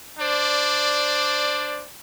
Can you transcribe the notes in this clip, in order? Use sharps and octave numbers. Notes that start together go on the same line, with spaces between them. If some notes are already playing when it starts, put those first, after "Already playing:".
D4 C5 D5